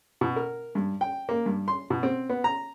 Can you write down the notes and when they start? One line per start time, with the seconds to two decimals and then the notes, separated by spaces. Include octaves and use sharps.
0.21 B2
0.36 A#4
0.75 G2
1.01 G5
1.29 A#3
1.46 G2
1.68 C6
1.90 B2
2.03 C4
2.29 B3
2.44 A#5